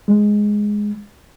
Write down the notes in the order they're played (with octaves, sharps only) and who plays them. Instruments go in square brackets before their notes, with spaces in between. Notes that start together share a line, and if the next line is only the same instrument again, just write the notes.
[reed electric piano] G#3